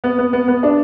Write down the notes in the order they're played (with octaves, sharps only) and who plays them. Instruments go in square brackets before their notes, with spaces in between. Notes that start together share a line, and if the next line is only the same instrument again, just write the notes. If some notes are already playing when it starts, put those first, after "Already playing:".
[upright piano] B3
B3
B3
B3
D4